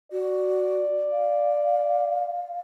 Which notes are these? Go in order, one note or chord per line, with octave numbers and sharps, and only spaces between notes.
F#4 D5
F5